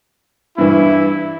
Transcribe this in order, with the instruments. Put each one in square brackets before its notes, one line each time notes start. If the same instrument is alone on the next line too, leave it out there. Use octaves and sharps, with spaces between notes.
[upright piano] G2 E3 [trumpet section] E4